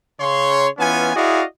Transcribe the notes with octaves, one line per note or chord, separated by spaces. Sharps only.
C#3 C#5 C6
E3 B3 C#4 F4 G#5
E4 F#4 G#4 D5 D#5 F5